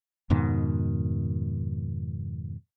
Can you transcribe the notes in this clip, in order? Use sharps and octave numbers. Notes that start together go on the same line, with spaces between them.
F2 G#2 B2 D#3